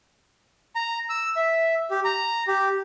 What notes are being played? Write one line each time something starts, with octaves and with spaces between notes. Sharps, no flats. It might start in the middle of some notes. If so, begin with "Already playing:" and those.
A#5
E6
E5
G4
A#5
G4